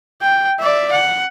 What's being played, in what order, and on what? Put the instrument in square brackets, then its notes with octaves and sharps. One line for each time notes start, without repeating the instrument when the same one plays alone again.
[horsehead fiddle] G5
D5 E5
F#5